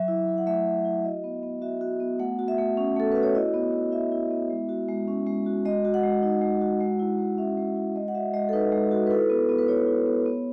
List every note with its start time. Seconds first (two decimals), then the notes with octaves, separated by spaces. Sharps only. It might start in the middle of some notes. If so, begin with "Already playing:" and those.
Already playing: F#3 E5
0.08 E4
0.28 F#3
0.38 F#5
0.47 A3 E5
0.66 F#3
0.85 E4
1.04 F#4 D#5
1.24 B3
1.43 B3
1.62 F#4 E5
1.81 F#4
2.00 B3
2.20 A3 F#5
2.39 F#4
2.48 E5
2.58 A3
2.77 C#4
2.96 A3 A4
3.12 F#4 B4
3.23 C#5
3.35 E4 D#5
3.54 B3
3.73 B3
3.92 E4 E5
4.12 E4
4.31 B3
4.50 G#3
4.69 F#4
4.88 G#3
5.08 C#4
5.27 G#3
5.46 F#4
5.65 G#3 D#5
5.85 F#4
5.94 F#5
6.03 G#3
6.23 D#4
6.42 G#3
6.61 F#4
6.81 G#3
6.99 E4
7.19 G#3
7.38 C#4 E5
7.57 G#3
7.76 E4
7.95 G#3 D#5
8.08 F#5
8.15 F#4 E5
8.34 G#3 D#5
8.49 A4
8.53 D#4 B4
8.72 G#3
8.91 F#4
9.07 B4
9.11 E4 A4
9.30 B3
9.49 B3
9.59 B4
9.68 E4 C#5
9.87 E4
10.06 B3
10.26 B3